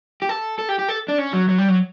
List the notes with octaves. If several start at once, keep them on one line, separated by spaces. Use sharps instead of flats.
G4
A4
A4
G4
G4
A4
D4
C#4
F#3
F#3
G3
F#3